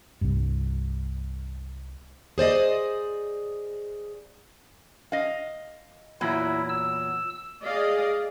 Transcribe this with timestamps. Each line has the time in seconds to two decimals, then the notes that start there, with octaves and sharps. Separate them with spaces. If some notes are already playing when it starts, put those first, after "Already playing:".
0.21 C2 G2
2.38 G#4 C5 D5 D#5
5.12 D#5 F5
6.21 E2 A#2 F#3 E4
6.69 E6
7.64 G#4 D5 D#5 F5